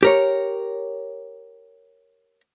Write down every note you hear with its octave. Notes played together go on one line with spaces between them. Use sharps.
G4 A#4 C#5